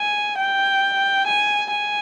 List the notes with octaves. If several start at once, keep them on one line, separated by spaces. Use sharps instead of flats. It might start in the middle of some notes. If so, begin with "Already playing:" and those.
Already playing: G#5
G5
G#5
G#5